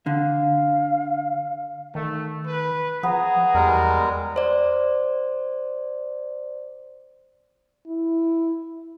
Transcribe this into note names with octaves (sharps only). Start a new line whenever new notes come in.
D3 F5
D#3 A3
B4
F3 B3 G#4 A#5
E2 G3 G#3 A#4
C5 D5
E4